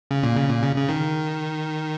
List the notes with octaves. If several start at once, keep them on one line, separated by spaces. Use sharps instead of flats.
C#3
A#2
C#3
A#2
C#3
C#3
D#3